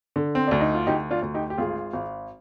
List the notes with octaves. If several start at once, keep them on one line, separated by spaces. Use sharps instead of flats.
D3
C4
D2 D4
D#4
F4
D2 D#4 G4
D4 F4
D2
D#4 G4
G4
G#1 F4 G#4
G#1